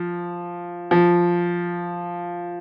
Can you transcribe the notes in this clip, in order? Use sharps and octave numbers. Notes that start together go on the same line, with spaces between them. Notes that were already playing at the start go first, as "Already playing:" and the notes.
Already playing: F3
F3